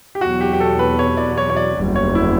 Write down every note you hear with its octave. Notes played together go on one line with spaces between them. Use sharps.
G4
E2 B2 F#3 F#4
G4
G4
A4
B4
C#5
D5
C#5
C#5
D5
F#1 E2 D3 G3
C#5
E4